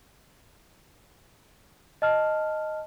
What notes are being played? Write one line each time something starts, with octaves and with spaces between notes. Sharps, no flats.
D#5 A5 F6